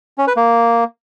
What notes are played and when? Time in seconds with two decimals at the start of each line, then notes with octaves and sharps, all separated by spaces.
0.18 C#4
0.27 B4
0.37 A#3